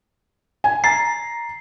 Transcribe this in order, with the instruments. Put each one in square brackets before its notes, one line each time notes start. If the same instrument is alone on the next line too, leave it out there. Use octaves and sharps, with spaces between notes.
[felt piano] G#5
[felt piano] A#5 A6 [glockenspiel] C7